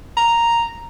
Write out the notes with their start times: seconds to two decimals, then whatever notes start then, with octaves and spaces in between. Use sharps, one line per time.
0.17 A#5